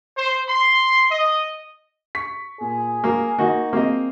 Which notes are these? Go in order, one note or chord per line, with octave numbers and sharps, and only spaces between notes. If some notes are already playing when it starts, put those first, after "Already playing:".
C5
C6
D#5
C#6 B6
A#2 G#4
A#3 A#4
D#3 A#3 D#4 F#4
A#3 C4 G#4 D#5